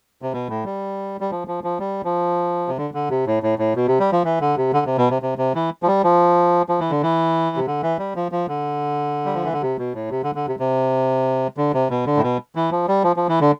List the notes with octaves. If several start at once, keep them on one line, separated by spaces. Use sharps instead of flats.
C3
B2
A2
G3
G3
F3
F3
F3
G3
F3
C3
D3
D3
C3
A2
A2
A2
B2
C3
G3
F3
E3
D3
C3
D3
C3
B2
C3
C3
C3
E3
F3
G3
F3
F3
E3
D3
E3
C3
D3
E3
G3
F3
F3
D3
G3
F3
E3
D3
C3
B2
A2
C3
D3
D3
C3
C3
D3
C3
B2
D3
A2
B2
E3
F3
G3
F3
F3
E3
D3